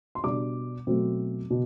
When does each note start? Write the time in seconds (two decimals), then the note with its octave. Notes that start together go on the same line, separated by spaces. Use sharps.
0.15 C6
0.24 B2 G3 D4 D6
0.87 B2 F#3 A3 C4
1.50 B2